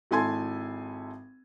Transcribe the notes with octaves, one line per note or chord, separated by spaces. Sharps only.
G#1 E4 A4 G#5 C6 G#6